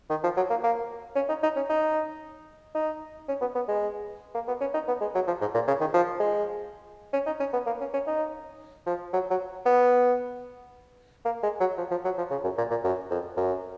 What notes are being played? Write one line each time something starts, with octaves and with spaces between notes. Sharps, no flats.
D#3
F3
F#3
A#3
A#3
C#4
D#4
D#4
C#4
D#4
D#4
C#4
B3
B3
G#3
A#3
B3
C#4
D#4
B3
G#3
F#3
F3
G#2
A#2
C#3
D#3
F3
G#3
C#4
D#4
C#4
B3
A#3
C#4
C#4
D#4
F3
F#3
F#3
B3
A#3
G#3
F#3
F3
F3
F#3
F3
C#3
F#2
A#2
A#2
F#2
F2
F#2